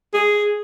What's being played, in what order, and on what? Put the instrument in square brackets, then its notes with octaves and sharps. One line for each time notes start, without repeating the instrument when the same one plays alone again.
[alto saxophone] G#4